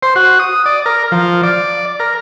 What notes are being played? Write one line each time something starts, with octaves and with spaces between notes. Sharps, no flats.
C5
F#4
D#6
D5
A#4
F3
D5
A#4